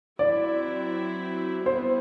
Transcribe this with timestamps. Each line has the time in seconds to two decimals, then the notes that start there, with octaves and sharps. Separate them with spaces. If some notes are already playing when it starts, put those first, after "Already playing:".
0.19 F#3 C4 E4 D5
1.66 G3 B3 E4 C5